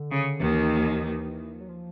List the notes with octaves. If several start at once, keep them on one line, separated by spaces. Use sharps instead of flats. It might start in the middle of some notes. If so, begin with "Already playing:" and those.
Already playing: D3
C#3
D#2 D#3 E3
F3
F#3
F3